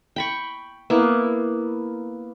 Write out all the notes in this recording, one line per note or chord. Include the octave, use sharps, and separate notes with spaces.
G5 B5 C#6
A#3 B3 E4